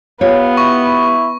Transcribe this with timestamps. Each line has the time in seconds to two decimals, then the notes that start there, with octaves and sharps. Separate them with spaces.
0.21 B3 F4 G4 C#5 F5
0.57 E4 C#6